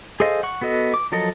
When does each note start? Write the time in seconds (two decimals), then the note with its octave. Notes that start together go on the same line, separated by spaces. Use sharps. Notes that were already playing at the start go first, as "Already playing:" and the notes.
0.20 G#4 A4 C5 D#5 F5
0.43 F#5 C#6
0.61 B3 F#4 A4 D#5
0.94 D6
1.12 F3 F#3 A4 A#4 D#5